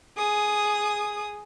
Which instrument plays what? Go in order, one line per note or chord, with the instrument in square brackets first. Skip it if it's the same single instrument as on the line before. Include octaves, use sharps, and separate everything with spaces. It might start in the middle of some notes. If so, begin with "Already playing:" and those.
[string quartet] G#4 D#6